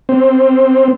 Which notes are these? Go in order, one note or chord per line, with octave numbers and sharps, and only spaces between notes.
C4